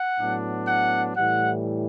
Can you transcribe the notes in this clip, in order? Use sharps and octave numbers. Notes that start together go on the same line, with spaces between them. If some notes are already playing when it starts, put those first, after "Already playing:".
Already playing: F#5
A2 F#3 B3 D4
F#5
A2 E3 G3 F#5